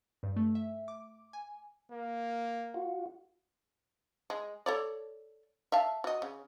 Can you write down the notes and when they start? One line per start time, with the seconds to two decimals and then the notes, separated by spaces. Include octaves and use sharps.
0.23 G2
0.36 A3
0.55 E5
0.88 D6
1.33 G#5
1.92 A#3
2.74 F4 F#4
4.30 G#3
4.66 A4 C#5 D5
5.72 E5 F5 A5
6.04 F#4 D#5
6.22 C#3